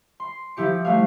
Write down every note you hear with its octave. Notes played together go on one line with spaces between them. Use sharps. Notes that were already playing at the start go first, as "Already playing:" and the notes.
C6
F3 E4 G4 C#7
G3 A3 F#4 F5